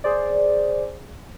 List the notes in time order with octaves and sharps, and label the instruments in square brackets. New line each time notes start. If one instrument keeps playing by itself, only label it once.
[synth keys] G#4 C5 D5